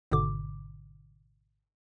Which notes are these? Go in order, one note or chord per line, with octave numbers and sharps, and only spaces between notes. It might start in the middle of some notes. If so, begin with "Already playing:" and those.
G#1 G#2 B2 D3 D6